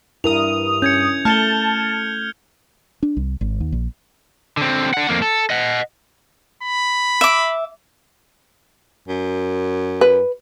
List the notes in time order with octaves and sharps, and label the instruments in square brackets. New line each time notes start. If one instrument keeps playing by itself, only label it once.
[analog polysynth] G2 D#6 [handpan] E4 A#4 [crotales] F7
[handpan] C#4 [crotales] G6 G#6 C#7
[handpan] A3 [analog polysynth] A5 [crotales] F6 C#7 G7
[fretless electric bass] D4
C2
G#1
D#2
A#1
[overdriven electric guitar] D3 C4
D4 F#5
F2 A#3
A4
D#5 F#5
[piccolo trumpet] B5
[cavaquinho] E5 D6
[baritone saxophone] F#2
[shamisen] B4